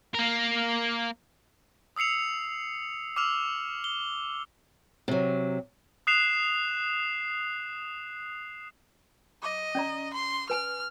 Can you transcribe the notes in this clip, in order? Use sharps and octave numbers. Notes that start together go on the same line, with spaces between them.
A#3 A#4
D#6 E6 C7 C#7 F7
D6 E6 F6 F7
G7
C3 F#3
D#6 F#6 C7 E7 F7
D#5 D6
C#4 D5 A#5
C6
B4 G#5 F6